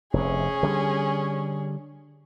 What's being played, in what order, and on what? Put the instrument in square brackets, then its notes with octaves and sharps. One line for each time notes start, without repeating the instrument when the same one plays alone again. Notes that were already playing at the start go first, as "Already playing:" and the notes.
[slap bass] F1 C3 [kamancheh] C#4 G#4
[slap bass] D3 G3